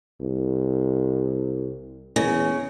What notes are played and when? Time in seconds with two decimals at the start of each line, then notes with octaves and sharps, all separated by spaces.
0.21 C2
2.16 E2 C#3